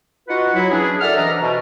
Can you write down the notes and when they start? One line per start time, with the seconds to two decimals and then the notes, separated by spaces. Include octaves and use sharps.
0.28 D#4 F4 F#4 B4 F#5
0.54 F#3 E4
0.70 E3 C#4 D4 G#4
1.01 F#2 A4 D5 E5 F#5 F6
1.16 C3 E3 D4 D#5 E5 A#5
1.41 B2